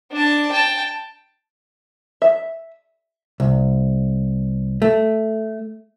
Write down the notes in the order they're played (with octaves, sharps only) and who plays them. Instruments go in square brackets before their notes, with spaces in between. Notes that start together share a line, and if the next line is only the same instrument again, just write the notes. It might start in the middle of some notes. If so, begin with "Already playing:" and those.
[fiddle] D4 A5
G5 A5
[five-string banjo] E5
[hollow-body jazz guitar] C2
A3